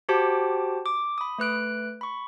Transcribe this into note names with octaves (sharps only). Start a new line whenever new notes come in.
F#4 G4 C5 G5 A5 D6
D6
B5 D#6
A3 B4 F#6 D7
B5 C#6